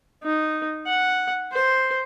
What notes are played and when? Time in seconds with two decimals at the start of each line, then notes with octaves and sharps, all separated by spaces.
0.23 D#4
0.87 F#5
1.52 C5